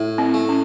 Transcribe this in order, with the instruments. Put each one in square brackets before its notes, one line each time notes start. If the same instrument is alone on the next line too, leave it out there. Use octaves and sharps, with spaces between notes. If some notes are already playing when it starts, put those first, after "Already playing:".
Already playing: [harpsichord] A2
[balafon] C4
[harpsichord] A3
[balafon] C#4